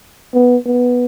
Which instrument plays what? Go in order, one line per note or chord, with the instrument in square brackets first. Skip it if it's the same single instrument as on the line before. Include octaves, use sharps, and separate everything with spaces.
[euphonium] B3
B3